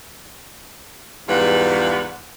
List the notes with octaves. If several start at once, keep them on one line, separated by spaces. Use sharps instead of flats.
E2 G#2 G3 F4 B4 F#5